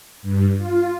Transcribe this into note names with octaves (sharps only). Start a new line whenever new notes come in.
G2
F4